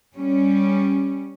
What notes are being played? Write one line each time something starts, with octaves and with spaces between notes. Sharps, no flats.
G3 C#4